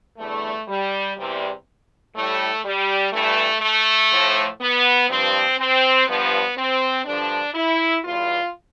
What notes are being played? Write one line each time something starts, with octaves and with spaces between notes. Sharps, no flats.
E2 D3 G3 A3
G3
E2 C3 G3
A2 G3 A3
G3
G2 E3 G3 A3
A3
A2 F3
B3
G2 F3 C4
C4
G2 F3 B3
C4
G2 D3 F3 D4
E4
E2 B2 G3 F4